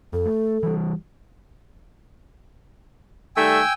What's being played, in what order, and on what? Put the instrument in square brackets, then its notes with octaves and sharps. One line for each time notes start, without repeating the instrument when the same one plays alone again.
[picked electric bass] F2 [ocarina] A4
[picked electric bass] A3
E3 G3
[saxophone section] D#3 G3 A3 [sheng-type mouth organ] G5 G#5 E6